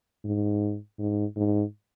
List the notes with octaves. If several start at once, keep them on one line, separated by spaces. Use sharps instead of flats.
G#2
G#2
G#2